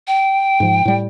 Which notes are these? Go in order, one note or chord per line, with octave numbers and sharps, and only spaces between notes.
G5
G#2 F3
A2 G3